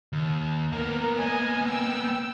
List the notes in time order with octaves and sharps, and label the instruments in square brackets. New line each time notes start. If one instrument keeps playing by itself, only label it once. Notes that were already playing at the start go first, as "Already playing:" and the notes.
[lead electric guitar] D#2
[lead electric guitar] A#3 B3 [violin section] A#4
[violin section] D#5 G#5
G5 E6